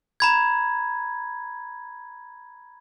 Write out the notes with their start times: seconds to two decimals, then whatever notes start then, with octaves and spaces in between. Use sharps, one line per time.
0.20 A#5 B5 G#6